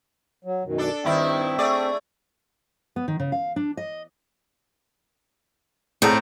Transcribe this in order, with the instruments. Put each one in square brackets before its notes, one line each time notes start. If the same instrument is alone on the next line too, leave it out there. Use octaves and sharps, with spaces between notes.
[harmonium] F#3
F#2 B2 D#3
[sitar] D4 A4
[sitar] G2 D#3 E4 [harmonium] C4 E5 G5
[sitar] A3 G#4 D5
[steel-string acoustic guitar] B3
D#3
C#3
F5
D4
D#5
[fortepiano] A2 A3 A#5 [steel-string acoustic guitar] C4 [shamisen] G#4 D5 F#5